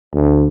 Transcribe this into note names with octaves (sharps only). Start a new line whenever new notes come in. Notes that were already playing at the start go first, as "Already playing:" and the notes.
D2